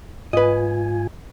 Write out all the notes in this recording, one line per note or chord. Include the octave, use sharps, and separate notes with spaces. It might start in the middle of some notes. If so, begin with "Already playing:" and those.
G#2 F4 B4 D#5 G#5